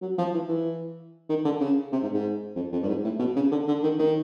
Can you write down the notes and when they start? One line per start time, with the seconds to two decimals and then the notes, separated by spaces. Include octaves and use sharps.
0.02 F#3
0.18 F3
0.34 E3
0.49 E3
1.29 D#3
1.45 D3
1.61 C#3
1.93 C3
2.03 G#2
2.13 G#2
2.56 F2
2.73 F2
2.83 G2
2.88 G#2
3.04 A2
3.19 B2
3.36 C#3
3.51 D3
3.68 D3
3.83 D#3
3.99 D#3